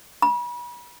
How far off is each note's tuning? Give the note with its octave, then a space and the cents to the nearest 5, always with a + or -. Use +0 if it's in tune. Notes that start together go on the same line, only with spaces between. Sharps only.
B5 -35